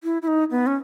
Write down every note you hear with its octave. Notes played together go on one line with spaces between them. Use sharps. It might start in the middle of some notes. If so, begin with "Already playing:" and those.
E4
E4
D#4
B3
C#4